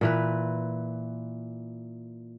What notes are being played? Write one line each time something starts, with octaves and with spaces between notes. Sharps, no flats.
A#2 E3 B4